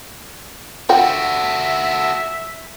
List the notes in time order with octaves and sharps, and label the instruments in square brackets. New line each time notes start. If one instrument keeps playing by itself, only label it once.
[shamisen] F4 F#5 G5 [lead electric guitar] F#4 A4 [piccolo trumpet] E5